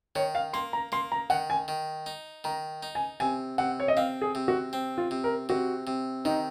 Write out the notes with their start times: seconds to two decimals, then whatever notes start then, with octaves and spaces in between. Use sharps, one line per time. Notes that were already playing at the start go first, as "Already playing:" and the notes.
0.16 D#3 C#5
0.35 F5
0.53 A#3 C6
0.73 A#5
0.92 A#3 C6
1.12 A#5
1.30 D#3 F#5
1.50 G#5
1.68 D#3
2.06 D#4
2.44 D#3 A#5
2.83 D#4
2.95 G#5
3.20 C3 G#5
3.58 C3 F#5
3.80 C#5
3.88 D#5
3.97 C4 F5
4.21 G#4
4.35 C3
4.48 F#4
4.73 C4
4.98 F4
5.11 C3
5.24 A#4
5.49 C3 F#4
5.87 C3
6.25 D#3 D#4